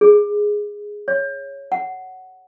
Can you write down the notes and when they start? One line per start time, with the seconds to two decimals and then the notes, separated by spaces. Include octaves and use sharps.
0.01 G#4
1.08 C#5
1.72 F#5